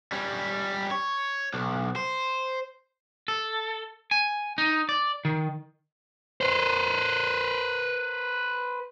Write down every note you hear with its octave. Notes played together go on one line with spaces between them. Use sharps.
G3 C#4
C#5
B1
C5
A4
G#5
D#4
D5
D#3
B4 C5